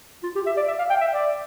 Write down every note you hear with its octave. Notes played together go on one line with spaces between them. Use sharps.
F4
G4
E5
D5
E5
F5
G5
E5
D5